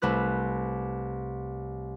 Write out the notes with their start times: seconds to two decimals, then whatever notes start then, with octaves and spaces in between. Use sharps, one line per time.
0.02 C2 A3 B4 F#6